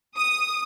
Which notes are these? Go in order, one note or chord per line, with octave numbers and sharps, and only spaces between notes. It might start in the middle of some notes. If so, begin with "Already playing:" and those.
D#6